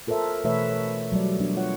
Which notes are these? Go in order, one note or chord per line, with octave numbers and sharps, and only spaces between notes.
F4 A4 A#4 C5 E5
B2 E3 A3 B4 C#5 E5
C#5
F#3 G3 D5
B3 D4 F#4 C#5
F#3 F4 C#5 F#5